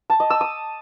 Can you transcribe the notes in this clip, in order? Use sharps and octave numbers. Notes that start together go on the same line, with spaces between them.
A5
D#5
E6
D#6